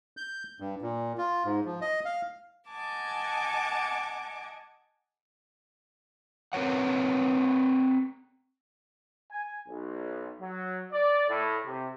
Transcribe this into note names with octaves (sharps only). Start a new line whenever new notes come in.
G6
G2
A#2
F4
G#2
F3
D#5
F5
D#5 F#5 G#5 A5 D6
C4 A#4 B4 C#5 F#5
G#5
B1
F#3
D5
A2
C3